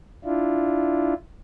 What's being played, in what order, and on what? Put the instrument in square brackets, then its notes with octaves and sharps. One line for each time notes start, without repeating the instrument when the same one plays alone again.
[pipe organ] D4 E4 F4